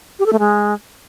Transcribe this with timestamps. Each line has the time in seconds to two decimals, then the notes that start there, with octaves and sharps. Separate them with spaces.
0.19 G4
0.26 A4
0.33 A3
0.39 G#3